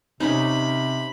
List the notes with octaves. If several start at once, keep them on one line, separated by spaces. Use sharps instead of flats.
C3 C#4 D#4 B5